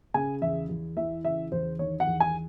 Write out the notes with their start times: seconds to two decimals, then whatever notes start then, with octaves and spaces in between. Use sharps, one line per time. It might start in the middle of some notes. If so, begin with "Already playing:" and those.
0.14 C#3 G#5
0.42 E2 E5
0.69 E2
0.97 E3 E5
1.25 C#3 E5
1.52 E2 C5
1.79 D#3 C#5
2.00 F#5
2.07 E2
2.20 G#5